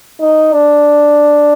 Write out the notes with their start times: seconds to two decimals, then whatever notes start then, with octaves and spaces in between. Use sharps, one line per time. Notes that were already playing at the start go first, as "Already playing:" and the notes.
0.21 D#4
0.53 D4